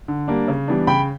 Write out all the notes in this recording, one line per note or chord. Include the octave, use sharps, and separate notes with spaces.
D3
G3 A#3 D4
C#3
E3 G3 B3 D4
C#3 G5 B5